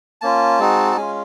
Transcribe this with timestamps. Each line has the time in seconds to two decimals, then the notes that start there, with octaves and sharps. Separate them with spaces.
0.21 A#3 C#4 F4 A5
0.60 G#3 C4 D#4 F#4
0.91 A5
0.97 G#3 C#4 F4 G#5